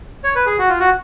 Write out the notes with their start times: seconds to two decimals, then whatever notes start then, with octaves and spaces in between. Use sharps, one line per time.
0.24 C#5
0.35 B4
0.46 G#4
0.59 F#4
0.69 F4
0.80 F#4